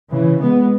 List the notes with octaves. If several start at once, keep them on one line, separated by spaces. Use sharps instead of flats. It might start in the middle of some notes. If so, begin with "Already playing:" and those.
C#3 E3
G#3 B3